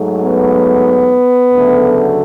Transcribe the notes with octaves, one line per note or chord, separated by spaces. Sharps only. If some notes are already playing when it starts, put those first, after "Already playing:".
Already playing: G#2 F#3 A3
B3
D2 C#3 F#3 A3